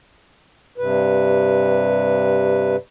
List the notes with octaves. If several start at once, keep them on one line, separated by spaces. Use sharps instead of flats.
G2 C3 B4